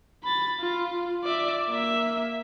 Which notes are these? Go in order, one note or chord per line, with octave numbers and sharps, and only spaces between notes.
B5 A6
F4
D5 E5
A#3 E5